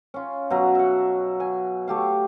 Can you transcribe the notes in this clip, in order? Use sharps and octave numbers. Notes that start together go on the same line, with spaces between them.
C#4 F4
B2 F#3
E5 F#5
G#5
A3 G4 F5